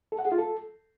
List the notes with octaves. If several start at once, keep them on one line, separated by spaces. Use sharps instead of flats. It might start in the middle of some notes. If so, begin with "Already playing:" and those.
A4
F#5
G#4
F4
A4